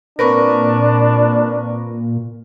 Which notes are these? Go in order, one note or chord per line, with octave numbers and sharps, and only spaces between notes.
A#2 C4 D4 A#4 B4 C#6 A#6